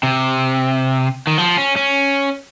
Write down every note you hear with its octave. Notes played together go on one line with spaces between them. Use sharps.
C3
D#3
F3
C#4
C#4